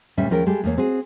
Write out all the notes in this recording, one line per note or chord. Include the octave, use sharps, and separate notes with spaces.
D2 A#2 G3 C#4 E5
D#2 F3 C#4 G#4 A#4 G5
G3 G#3 G4 A4
E2 A#3 C#5
C4 F#4 G#4